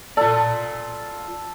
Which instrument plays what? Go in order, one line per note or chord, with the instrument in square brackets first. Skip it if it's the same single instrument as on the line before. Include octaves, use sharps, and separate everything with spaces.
[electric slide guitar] F4 D5 [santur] A4